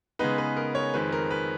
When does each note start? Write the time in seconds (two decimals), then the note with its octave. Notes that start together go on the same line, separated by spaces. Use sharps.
0.19 C#3 G#3 B3 D#4 B4
0.38 B4
0.57 A#4
0.75 C#5
0.94 F2 D#3 G#3 B4
1.12 A#4
1.31 B4